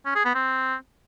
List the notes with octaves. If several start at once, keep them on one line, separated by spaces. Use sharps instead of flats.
C#4
G#4
B3
C4